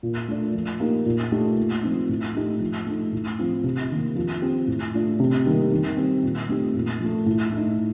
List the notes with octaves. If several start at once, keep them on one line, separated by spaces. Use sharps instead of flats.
A#2
A3 D4
F3
A#3 D#4 G4
A#2
A3 D#4 G4
A#2
F3 C4 D#4
A2
A3 D#4 G4
F3
A3 D#4
A2
F3 C4 F4
C3
D#3 A#3
F3
C4 G4
A2
A3 D4 F4
C3
D#3 G3 A#3 D#4
D#3
G3 C4
A#2
A3 C4 D#4 G4
A#2
F3 A3
A2
A3 D#4